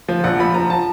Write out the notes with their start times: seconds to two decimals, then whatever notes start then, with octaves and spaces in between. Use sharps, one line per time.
0.08 F3
0.24 A#1 F#5
0.39 F3 B5
0.54 F3 A#5
0.70 A5